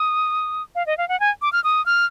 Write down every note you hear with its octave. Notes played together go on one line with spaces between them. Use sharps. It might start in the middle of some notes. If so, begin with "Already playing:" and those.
Already playing: D#6
F5
D#5
F5
F#5
G#5
D6
F6
D#6
F6